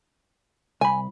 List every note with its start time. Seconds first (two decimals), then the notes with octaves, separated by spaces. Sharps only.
0.81 C2 G#5 B5